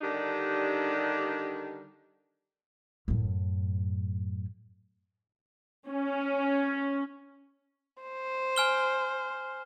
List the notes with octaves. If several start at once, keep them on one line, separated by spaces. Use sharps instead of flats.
D3 D#3 G3 D4 D#4 G4
F#2 A2
C#4
C5
G#5 F6 G7